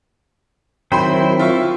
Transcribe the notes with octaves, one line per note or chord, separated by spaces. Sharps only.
D#3 F#3 C4 E4 C5 G5 B5 C6
F4 E5 C#6